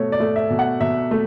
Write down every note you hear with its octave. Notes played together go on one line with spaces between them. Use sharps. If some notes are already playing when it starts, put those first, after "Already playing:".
Already playing: B2 A3 C#5
D5
A3
E5
B2
F#5
B2 E5
A3